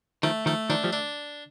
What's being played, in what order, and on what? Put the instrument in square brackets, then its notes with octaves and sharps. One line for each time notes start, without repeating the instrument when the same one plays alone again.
[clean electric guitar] D#3 F3 [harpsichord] A3
[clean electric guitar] D#3 F3 [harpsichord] A3
[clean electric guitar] D#3 F3 [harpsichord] D4
[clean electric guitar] F3 G3
[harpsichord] D4